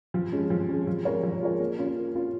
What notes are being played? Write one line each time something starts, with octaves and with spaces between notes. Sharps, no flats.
F3
G#3 C#4
F3
G#3 C#4
F3
G#3 F4 A#4 C#5
F3
G#3 F4 A#4 C#5
A#3
C#4 F4
A#3
C#4 F4